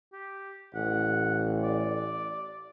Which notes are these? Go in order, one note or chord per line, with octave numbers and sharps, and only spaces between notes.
G4
A1 F#5
D5